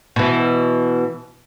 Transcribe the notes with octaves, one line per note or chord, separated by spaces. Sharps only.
B2 E3